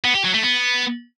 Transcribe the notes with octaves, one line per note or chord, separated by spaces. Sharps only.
B3
G4
F#3
A3
B3